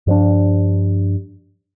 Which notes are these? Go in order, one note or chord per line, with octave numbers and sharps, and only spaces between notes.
G2 F3 D4